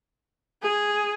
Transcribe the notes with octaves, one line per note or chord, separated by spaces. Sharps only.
G#4